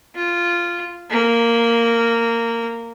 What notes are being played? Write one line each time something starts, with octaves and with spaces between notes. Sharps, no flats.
F4
A#3